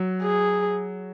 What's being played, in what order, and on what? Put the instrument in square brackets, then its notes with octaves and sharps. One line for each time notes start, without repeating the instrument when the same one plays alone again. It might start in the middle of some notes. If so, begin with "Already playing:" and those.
Already playing: [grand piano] F#3
[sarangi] G#4